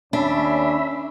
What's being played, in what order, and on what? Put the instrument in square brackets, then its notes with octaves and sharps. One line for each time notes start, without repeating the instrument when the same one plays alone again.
[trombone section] D#2 C#4 [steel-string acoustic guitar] D4 [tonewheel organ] E5 B5